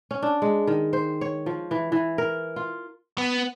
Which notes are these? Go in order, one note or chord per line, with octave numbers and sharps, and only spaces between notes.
C#4
D4
G#3
D#3
C5
C#5
F3
E3
E3
A#4
F4
B3